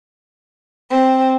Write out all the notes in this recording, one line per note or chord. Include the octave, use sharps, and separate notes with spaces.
C4